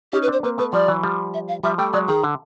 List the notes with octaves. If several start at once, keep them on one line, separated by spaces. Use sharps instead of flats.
C#4 D#4 G4
B4
C4 D4 C5
A#3 C4 B4
A3 B3 B4
F3 G3 D5
E3 F#3
F3 G3
E5
F5
F3 G3 E5
G3 A3 G5
F#3 G#3 D5
D#3 G#4
D3